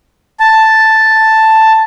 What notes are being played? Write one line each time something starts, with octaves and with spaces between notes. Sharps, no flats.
A5